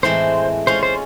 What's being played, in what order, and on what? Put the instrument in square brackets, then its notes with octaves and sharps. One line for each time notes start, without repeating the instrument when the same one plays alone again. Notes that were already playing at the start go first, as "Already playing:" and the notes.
[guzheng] A2 E3 G#3 C4 [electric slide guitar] C5
[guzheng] G#3 C#4 F4 [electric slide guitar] C5
[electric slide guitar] C5